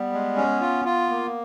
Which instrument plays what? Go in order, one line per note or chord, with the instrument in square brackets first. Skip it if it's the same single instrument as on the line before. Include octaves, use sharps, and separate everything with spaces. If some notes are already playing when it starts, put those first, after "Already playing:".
Already playing: [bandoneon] G3 [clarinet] B3
[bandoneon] G#3
C#4
F4
F4
A#3